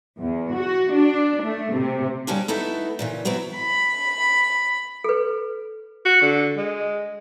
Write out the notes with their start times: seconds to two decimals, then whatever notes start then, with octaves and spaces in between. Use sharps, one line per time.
0.19 E2
0.53 F#4
0.94 D4
1.42 A3
1.73 C3
2.27 G3 A#3 C#4 D4
2.48 A3 B3 D#4 E4 A4
2.99 A#2 C#3 E3
3.25 F#3 B3 C4 E4 F#4
3.57 B5
5.04 A4 B4
6.06 F#4
6.22 D3
6.57 G#3